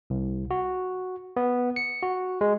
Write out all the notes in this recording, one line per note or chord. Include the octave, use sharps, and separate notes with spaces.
C2
F#4
B3
C#7
F#4
G#3